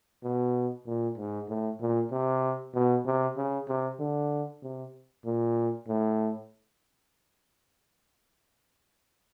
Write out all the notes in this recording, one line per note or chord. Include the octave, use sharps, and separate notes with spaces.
B2
A#2
G#2
A2
A#2
C3
B2
C3
C#3
C3
D3
C3
A#2
A2